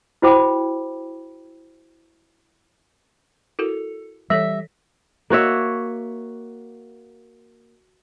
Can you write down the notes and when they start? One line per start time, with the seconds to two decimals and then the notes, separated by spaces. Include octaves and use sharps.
0.22 E4 F#4 C5 G5 B5 D6
3.59 E4 F#4 A4 A#4
4.30 E3 G3 A4 C#5 E5 A#6 B6
5.30 A#3 F#4 C#5 E5